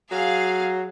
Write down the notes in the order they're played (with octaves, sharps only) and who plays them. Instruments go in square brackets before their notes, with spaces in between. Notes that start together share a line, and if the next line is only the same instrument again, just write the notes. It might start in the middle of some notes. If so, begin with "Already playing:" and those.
[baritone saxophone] F#3 [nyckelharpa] G#4 [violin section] F5